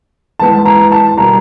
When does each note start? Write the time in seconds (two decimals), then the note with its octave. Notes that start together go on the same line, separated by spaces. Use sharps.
0.39 E3 G#3 B3 A5
0.66 A#5
0.92 A5
1.17 B2 G3 A#3 A#5